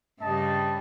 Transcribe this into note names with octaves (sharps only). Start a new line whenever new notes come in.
G2 C#3 G3 D#5 A5